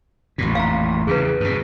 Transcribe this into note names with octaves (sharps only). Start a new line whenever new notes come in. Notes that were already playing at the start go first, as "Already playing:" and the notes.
A1 F2 A#2
F5 A#5
E2 C#3 G#4 B4
G2 B2